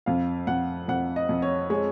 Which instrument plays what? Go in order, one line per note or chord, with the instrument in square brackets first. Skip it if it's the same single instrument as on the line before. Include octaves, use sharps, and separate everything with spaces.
[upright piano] F2 F5
F2 F#5
F2 F#5
D#5
F2
C#5
G#3 C#5